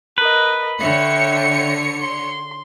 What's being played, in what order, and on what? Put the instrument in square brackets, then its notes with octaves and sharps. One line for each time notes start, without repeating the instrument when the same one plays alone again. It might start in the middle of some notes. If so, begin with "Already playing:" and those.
[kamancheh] A#4 D#5 [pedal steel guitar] B4
[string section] D3 C#5 C#7 [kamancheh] E5 G5
[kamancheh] C6